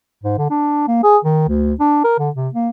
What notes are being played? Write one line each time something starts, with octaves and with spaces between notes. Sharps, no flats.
G#2
D3
D4
A#3
G#4
D#3
D2
D4
A#4
D3
C3
A#3